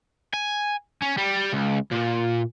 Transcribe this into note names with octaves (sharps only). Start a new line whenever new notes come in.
G#5
C#4
G3
C#2
A#2